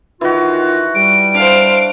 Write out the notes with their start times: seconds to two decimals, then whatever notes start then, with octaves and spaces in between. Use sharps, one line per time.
0.21 D#3 E3 F4 F#4
0.95 G3 D7
1.34 D4 C5 F5